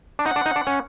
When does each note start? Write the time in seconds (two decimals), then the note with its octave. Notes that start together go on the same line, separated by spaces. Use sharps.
0.19 D4
0.25 D#4 F#5
0.36 D4
0.46 D#4
0.56 D4
0.67 C#4